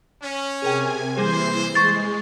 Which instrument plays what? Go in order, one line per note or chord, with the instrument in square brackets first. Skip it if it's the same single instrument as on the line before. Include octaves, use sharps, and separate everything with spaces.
[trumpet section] C#4
[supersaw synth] C3 G#5 [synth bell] G#4 A#4 G5
[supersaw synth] E3 C7 [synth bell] G3 A#3 G#4 [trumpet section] C5
[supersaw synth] G#3 [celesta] C#6 A6